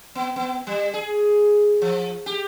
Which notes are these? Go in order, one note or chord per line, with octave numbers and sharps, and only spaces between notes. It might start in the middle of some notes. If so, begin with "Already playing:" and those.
B3
B3
G3
G#4
F3
G4